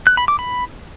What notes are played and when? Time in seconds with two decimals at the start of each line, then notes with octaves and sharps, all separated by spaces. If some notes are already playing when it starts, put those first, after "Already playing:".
0.07 F#6
0.17 B5
0.28 D6
0.39 B5